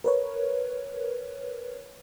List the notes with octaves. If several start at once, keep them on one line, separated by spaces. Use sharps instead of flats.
A#4 B4 C#5